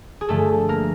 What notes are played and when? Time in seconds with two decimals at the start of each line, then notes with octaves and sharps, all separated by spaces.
0.21 G#4
0.28 G2 D3 F3 A3 A4
0.69 A#3 A#4